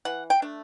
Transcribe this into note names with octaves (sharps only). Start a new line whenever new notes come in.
E3 F#5
G5
A3 D4